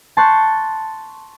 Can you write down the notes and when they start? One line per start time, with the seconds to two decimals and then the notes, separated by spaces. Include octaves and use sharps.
0.17 A5 C6 C#6 F#6 G6